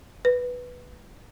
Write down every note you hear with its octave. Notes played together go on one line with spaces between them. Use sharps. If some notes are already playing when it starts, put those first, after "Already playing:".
B4